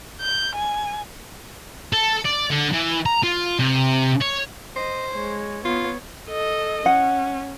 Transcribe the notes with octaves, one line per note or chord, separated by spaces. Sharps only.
G6
G#5
A4
D5
D3
E3
A#5
F4
C3
C#5
C5 D#5
G#3 C#5
B3 F4 C#5
A4 D#5
C#4 F#5